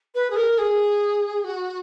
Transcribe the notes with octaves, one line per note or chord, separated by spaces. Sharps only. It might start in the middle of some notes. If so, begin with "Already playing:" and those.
B4
G#4
A#4
G#4
F#4